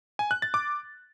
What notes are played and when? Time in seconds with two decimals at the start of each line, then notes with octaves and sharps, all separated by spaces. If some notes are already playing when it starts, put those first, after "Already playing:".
0.19 G#5
0.31 F#6
0.42 A6
0.54 D6